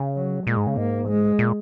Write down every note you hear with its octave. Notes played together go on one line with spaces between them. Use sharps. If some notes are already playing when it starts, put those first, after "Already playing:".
Already playing: C#3
F#3
A#2 G#3
G#2
C#3
G#2 A#3
G#3
A#2